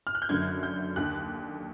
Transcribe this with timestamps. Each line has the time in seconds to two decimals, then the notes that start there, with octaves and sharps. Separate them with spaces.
0.07 F6
0.15 F#6
0.22 G6
0.29 F#1 F#2 D3 G#6
0.63 G6
0.96 D#2 D3 F#6